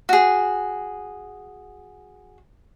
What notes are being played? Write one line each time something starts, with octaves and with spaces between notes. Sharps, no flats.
F#4 G#4